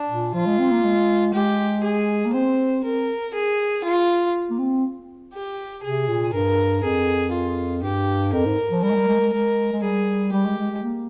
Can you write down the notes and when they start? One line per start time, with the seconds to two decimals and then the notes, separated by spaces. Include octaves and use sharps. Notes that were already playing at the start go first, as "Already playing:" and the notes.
Already playing: D4
0.09 A#2
0.33 F3 F4
0.47 G#3
0.59 C4
0.71 A#3
0.84 G#3
1.34 G#3 G4
1.84 G#4
2.25 A#3
2.34 C4 C5
2.84 C4 A#4
3.34 G#4
3.84 F4
4.50 A#3
4.59 C4
5.33 G4
5.84 C3 G#4
6.08 A#2
6.33 G2 A#4
6.83 F2 G#4
7.33 F4
7.83 G2 G4
8.33 F2 A#4
8.45 G#2
8.71 F3
8.83 G3 A#4
8.90 G#3
8.95 G3
9.08 G#3
9.20 G#3
9.33 G#3 A#4
9.72 G#3
9.83 G3 G#4
10.33 G3 G4
10.45 G#3
10.58 G#3
10.70 G#3
10.83 A#3